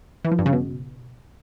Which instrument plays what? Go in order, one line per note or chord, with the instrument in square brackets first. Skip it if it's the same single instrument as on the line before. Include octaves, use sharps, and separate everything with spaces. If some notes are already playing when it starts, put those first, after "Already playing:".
[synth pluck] E3
F3
G2
C#3
B2